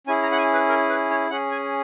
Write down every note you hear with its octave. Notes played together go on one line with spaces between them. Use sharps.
C#4 E4 G#4 G#5
A#5
F#5
G#5
B4
A#4
B4
C#5
C#4 G#4 F#5
G#5